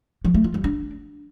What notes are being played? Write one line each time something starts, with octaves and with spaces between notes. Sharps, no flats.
F3
A3
F4
G3
D4